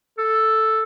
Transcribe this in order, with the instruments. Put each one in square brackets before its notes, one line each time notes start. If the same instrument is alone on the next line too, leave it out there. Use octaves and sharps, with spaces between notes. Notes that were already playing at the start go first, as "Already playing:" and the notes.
[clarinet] A4